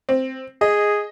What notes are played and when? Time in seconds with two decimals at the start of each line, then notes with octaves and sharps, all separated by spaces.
0.09 C4
0.61 G#4 D#5